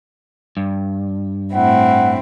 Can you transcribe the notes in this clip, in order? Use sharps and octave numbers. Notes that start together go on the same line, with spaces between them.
G2
A2 C4 E4 F#5